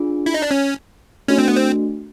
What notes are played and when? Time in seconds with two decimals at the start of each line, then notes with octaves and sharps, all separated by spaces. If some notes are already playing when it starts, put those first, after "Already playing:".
Already playing: D4 F4 G#4
0.26 E4
0.34 D#4
0.42 D4
0.51 C#4
1.28 A3 C#4 D4 F#4
1.38 C4
1.48 B3
1.56 C4